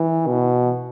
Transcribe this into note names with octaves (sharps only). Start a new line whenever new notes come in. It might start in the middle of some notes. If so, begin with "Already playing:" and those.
Already playing: E3
B2